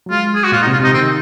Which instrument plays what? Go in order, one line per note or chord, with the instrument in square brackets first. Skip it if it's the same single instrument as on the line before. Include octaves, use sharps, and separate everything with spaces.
[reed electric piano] F#3
[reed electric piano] G#3 [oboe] F4
[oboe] G#4
F#4
[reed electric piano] A#2 [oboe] F4
[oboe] D#4
[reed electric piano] C3
[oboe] F4
[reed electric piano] C3
[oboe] D#4
[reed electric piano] D#3 [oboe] C4